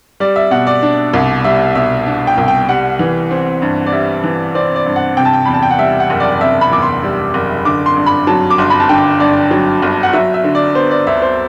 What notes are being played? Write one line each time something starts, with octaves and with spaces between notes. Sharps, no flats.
G3 D5
E5
B2 F#5
D5
D4
C2
G3 E5
B2 E5
D4
G5
C2
G5
G3 F#5
E3
C4
G2
D5
G3 E5
E3
C4 D5
D5
G2
F#5
C3 G5
A5
G5
E2 B5
A5
G5
F#5
G3 E5
F#5
F#1
D5
D5
C3 E5
B5
E2 D6
C6
G3
F#1
D3 D6
C6
G2
B5
F#3 A5
D6
G1 C6
B5
A5
D3 G5
G2 D5
F#3
G1
F#5
F#3 E5
E5
D3
D5
B3 C5
D5
D2 E5
C5